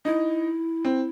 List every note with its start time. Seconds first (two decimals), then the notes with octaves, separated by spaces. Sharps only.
0.05 D#4 E4
0.85 C4